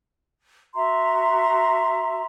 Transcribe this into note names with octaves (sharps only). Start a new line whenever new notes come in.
F#4 E5 A#5 C6